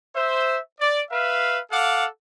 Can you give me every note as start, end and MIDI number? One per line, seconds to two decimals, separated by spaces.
0.15 0.58 72
0.15 0.58 76
0.80 1.02 74
1.11 1.60 71
1.11 1.60 76
1.11 1.60 77
1.71 2.06 69
1.71 2.06 77
1.71 2.06 78
1.71 2.06 86